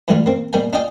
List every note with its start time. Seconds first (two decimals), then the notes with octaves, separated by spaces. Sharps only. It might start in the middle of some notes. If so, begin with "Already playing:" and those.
0.08 A2 E3 F#3 G3 A3 F4
0.26 A#3 C4
0.53 B2 G3 A#3 G5 G#5
0.73 D4 F4 D5 D#5 G5 G#5